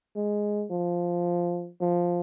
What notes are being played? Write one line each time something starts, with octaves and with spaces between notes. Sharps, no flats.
G#3
F3
F3